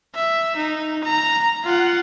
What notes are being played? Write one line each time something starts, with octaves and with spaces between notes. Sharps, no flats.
E5
D#4
A#5
F4 F#5